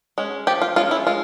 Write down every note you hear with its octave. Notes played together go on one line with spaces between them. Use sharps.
G#3 C#4
F3 G4
F4
G#3 C#4 F4
E4
G#3 F4